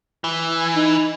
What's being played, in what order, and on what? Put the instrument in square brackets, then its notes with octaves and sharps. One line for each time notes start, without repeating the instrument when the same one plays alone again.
[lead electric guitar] E3
[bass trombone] D#4